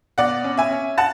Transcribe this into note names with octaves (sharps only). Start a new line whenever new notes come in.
B2 D5 F#5
C#4
E5 G#5
C#4
F#5 A5